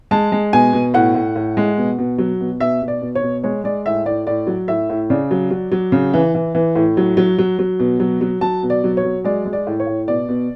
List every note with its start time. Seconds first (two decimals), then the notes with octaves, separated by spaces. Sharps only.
0.11 G#3 A5
0.32 G#3
0.53 B2 G#5
0.73 B2
0.94 A2 F#5
1.15 A2
1.36 A2
1.57 G#3
1.78 B2
1.98 B2
2.18 F#3
2.40 B2
2.60 B2 E5
2.82 B2
2.88 D5
3.02 B2
3.15 C#5
3.23 B2
3.43 G#3 C#5
3.64 G#3 D5
3.85 A2 E5
4.06 A2 D5
4.27 A2 D5
4.47 F#3
4.68 A2 E5
4.89 A2
5.10 C#3 D5
5.31 F#3
5.51 F#3
5.72 F#3
5.92 C#3
6.14 E3
6.35 E3
6.55 E3
6.75 A2
6.97 F#3
7.17 F#3
7.38 F#3
7.59 F#3
7.79 B2
8.00 F#3
8.21 F#3
8.41 F#3 A5
8.63 B2
8.70 D5
8.84 F#3
8.97 C#5
9.04 F#3
9.24 G#3 D5
9.45 G#3
9.53 D5
9.67 A2
9.80 C#5
9.87 A2
10.08 B2 D5
10.29 B2